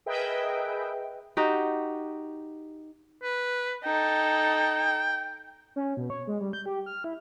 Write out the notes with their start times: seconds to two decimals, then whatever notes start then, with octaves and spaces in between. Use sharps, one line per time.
0.06 G#4 A#4 B4 D#5 E5 G5
1.37 D#4 F#4 G4
3.23 B4
3.84 D#4 A4 G5
5.76 C#4
5.97 B2
6.10 C#5
6.27 G#3
6.41 G3
6.53 G6
6.66 G4
6.86 F6
7.04 E4